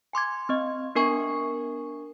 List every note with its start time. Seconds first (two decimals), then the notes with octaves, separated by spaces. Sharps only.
0.13 G#5 C6 D6 G#6
0.49 C4 D#5
0.95 B3 D4 A#4 G#5 C#6